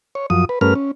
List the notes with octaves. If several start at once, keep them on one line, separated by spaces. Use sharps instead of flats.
C#5
F#2 F3 D#6
B4
G2 A3 C#4 A#4 B4 F6
C#4